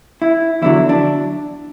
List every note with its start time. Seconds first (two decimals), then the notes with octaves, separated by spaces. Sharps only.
0.22 E4
0.62 E2 D3 F#3 E4
0.89 D4